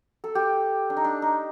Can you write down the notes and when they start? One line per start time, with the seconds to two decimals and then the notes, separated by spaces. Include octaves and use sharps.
0.24 A4
0.35 G4
0.90 D4
0.97 D#4
1.04 D4
1.22 D#4